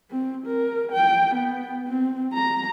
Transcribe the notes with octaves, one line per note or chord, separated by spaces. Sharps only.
C4
A#4
G5
B3
C4
A#5